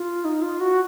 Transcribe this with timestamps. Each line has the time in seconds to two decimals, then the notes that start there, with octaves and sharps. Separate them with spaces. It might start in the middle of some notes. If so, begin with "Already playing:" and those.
Already playing: F4
0.24 D#4
0.42 F4
0.60 F#4